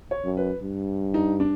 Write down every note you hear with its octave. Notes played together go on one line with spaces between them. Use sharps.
C#5
F#2
B4
G2
D#4
D4